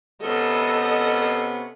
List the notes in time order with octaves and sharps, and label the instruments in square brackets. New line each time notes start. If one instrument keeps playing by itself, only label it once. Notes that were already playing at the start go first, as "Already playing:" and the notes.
[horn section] C3 B3 C#4 [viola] A4 D#5